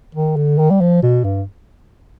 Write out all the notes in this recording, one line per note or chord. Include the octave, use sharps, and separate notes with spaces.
D#3
D3
D#3
G3
F3
B2
G2